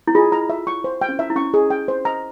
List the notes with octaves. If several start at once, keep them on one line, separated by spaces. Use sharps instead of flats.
E4
F4 G#4
A#5
E5
C#6
C5
G5
C#4
E4 E5
E4
C#4 C#6
G#4
G5
C5
A#5